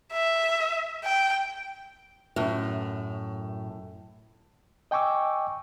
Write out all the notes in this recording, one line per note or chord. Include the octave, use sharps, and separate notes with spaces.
E5
G5
F#2 A2
D#5 G5 G#5 C#6 D6 E6